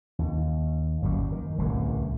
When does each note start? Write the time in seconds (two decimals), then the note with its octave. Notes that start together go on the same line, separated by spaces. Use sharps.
0.19 D#2
1.02 G1 F#2 F#3 G3
1.32 D#3
1.58 D1 C2 F#2 C3